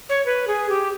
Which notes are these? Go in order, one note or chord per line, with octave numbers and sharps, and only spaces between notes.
C#5
B4
G#4
G4